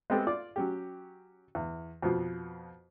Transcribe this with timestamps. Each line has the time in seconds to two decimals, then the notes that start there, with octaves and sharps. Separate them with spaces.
0.10 G#3 A3 B3 C4 G4 A4
0.27 F4 D5 D6
0.56 F#3 C#4 G4
1.55 E2
2.02 F2 B2 F3